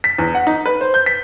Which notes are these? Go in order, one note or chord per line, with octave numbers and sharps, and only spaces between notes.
B6
E2
F#5
D#4
B4
C5
G6
B6